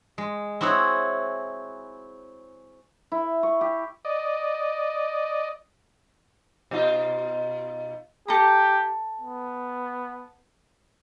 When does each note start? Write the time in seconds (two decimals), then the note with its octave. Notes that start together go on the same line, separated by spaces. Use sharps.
0.18 G#3
0.61 C4 E4 F#4 G#4 C#5
3.12 E4
3.43 C#6
3.61 G4
4.05 D5 D#5
6.71 B2 D#4 F4
8.28 G4 A4 A#5
9.21 B3